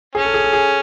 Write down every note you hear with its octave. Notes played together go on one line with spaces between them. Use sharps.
C#4 G#4
A4
G#4
A4
G#4